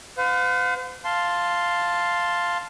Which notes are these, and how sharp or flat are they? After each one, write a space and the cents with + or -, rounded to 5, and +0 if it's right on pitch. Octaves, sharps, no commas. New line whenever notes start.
C5 -45 F5 +40
F5 +0 A5 +0 C6 +0